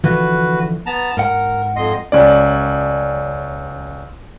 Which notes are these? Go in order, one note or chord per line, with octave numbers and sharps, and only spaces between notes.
D3 E3 F3 F#4 B4
B3 A5 A#5
G#2 A#4 F#5
F2 D#5 C6
C#2 C#4 D5